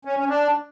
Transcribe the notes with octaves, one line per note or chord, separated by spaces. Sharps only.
C#4
C#4
D4